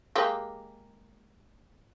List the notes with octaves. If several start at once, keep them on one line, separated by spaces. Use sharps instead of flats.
G#3 A#3 G4